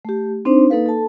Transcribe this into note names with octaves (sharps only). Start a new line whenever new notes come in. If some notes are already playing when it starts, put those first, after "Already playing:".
A3 G4
C4 D4 D#4 C5
A#3 D#4 A4 B4 F5
A4 A5